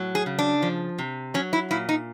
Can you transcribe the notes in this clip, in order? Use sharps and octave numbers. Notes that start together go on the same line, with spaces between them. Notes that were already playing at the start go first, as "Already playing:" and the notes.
Already playing: A2 F#3
G#4
C#3
D4
F3
C3
F#3 C#4
E4
A#2 E4
D#4